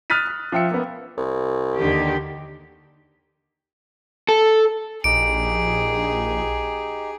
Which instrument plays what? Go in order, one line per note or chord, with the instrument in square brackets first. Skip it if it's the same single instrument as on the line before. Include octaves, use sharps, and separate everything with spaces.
[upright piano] D#6 F6 F#6 A6 B6 D#7
F6
F3 E5 G5 E6 C#7
A#3 B3
[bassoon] C2
[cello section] D#2 D#3 G4 [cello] D3
[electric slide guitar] A4
[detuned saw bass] A#1 [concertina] D#4 G4 [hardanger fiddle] G#4 [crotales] D7